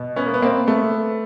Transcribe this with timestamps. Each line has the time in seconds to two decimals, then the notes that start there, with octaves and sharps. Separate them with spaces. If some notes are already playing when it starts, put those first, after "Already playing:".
Already playing: B2
0.16 B3 C#4
0.26 A#3
0.34 B3
0.42 A#3 C4
0.67 A3 B3